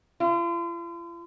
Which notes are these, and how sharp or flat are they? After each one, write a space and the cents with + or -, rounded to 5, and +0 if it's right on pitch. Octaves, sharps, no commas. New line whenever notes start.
F4 -45